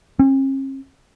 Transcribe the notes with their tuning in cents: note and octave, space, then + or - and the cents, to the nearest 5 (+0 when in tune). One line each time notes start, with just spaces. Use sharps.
C#4 -45